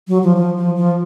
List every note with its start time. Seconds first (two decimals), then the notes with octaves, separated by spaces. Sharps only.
0.08 F#3
0.23 F3
0.37 F3
0.57 F3
0.76 F3